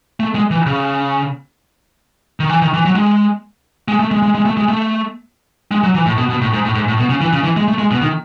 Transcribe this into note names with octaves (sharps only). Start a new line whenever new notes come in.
A3
G#3
E3
C#3
D#3
E3
D#3
E3
F#3
G#3
G#3
A3
G#3
G#3
G#3
A3
G#3
A3
G#3
F#3
E3
A2
B2
B2
A2
G#2
A2
G#2
A2
B2
C#3
E3
C#3
E3
G#3
A3
G#3
B2
D#3